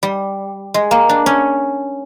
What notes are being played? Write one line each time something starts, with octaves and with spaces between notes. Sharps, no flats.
G3
G#3
A#3
D4
C#4